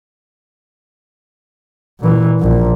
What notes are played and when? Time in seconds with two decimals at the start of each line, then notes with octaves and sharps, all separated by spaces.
2.00 A#2 E3
2.40 A#1 A#2